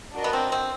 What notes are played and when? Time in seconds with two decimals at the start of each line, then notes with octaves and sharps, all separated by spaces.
0.15 D4 F#4 A#4 D#5
0.24 B3
0.33 C4
0.52 C4